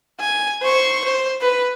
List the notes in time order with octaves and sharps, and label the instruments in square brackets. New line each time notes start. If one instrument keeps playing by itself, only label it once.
[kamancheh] G#5
C5 C#6
C5
B4